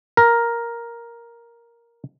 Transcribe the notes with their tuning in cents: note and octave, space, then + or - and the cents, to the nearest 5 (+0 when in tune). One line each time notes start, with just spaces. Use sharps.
A#4 +5